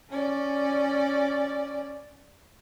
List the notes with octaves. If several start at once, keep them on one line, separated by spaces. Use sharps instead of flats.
C#4 D5